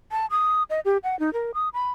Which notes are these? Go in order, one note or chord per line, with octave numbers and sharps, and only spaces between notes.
A5
D#6
D#5
G4
F#5
D#4
A#4
D#6
B5